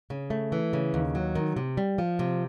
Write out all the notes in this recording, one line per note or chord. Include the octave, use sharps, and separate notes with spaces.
C#3
A3
E3
C#3
D#2
F#3
D#3
C3
G3
F3
C3